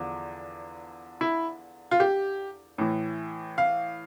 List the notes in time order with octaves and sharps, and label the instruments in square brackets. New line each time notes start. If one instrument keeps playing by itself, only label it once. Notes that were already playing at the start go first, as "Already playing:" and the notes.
Already playing: [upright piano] E2 D3 F3
E4
F4
G4
A2 E3
F5